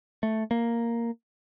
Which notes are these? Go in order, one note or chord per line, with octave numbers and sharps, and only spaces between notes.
A3
A#3